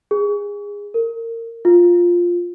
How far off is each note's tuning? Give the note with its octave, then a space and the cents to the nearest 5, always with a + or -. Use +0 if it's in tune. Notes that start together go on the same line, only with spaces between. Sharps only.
G#4 -25
A#4 -25
F4 +5